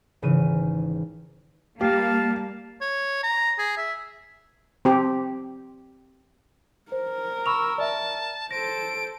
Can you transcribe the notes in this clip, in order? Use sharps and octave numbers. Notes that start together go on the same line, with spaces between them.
G#1 C#3 E3 D#7
G3 A#3 G4 F5 A5
C#5
A#5
G#4
E5
C4 G4
A#4 C5
B5 C#6 E6 F7
D5 E5 A5
A4 C5 A#6 D7